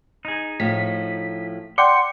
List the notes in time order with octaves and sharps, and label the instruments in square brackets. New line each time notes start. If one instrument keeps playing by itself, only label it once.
[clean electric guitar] D#4 G#4
[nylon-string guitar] A2 F3 [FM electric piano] B6
[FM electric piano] D5 F#5 G5 [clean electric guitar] C6 [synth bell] D6 C#7